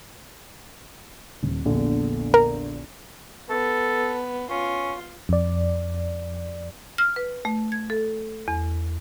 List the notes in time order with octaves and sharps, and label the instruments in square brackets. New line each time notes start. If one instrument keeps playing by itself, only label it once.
[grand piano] D#1
A#1 E2 D3
[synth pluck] A#4
[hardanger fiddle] B3 [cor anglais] A4
[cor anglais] C#4 [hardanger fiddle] F4
[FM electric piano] F2 D5
[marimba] F6
B4
A3
G#6
A4
E2